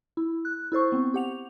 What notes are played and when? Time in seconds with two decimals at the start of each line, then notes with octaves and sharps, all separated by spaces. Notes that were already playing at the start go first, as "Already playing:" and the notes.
0.17 E4
0.45 F#6
0.72 E4 A4 C5 C#6
0.92 B3 C4
1.14 G4 F#5 F7